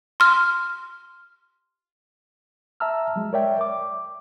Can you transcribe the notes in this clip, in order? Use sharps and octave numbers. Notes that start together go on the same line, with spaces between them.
C6 F6
E5 A5 A#5 E6 F6
F#3 G#3
A#4 C#5 D5 E5 G5
D6